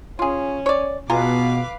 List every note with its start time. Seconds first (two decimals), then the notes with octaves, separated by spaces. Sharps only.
0.19 C#4 F4 G#4
0.66 C#5 D5
1.10 B2 F4 G#4 B4 F5 A#5 D6